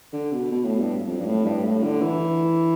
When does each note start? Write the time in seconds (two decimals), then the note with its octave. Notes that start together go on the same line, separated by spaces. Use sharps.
0.13 D3
0.32 B2
0.51 B2
0.65 A2
0.79 G2
1.07 F2
1.21 G2
1.26 A2
1.45 G2
1.64 A2
1.83 D3
2.02 E3